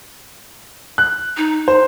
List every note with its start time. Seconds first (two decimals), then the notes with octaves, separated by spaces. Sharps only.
0.98 F#6
1.37 D#4
1.68 C5